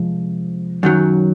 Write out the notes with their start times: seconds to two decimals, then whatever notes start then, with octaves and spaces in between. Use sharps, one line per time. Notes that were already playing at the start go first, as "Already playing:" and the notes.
Already playing: C3 F3 G#3
0.83 F#2 D#3 F#3